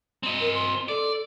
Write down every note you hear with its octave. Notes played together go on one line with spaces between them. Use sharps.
C4 D#5
A#4
C6
A4 D5